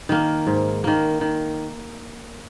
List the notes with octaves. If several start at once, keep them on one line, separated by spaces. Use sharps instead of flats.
D#3 A#3
G#2
D#3 A#3
D#3